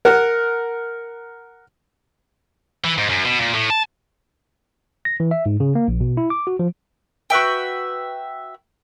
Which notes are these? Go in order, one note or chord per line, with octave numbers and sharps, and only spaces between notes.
A#4 F#5
E3
G#2
F#2
B2
A#2
A2
A5
A#6
E3
E5
G#2
C#3
A#3
A#1
B2
E4
D6
F#4
F3
F#4 B4 E5 G5